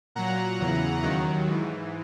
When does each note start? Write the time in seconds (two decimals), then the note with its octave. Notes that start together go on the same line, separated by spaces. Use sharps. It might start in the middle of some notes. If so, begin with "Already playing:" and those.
0.15 A#2 F#3 F#5 A#5
0.60 E2 C#3 E3
1.03 D#2 D#3 F#3
1.47 G#2 E3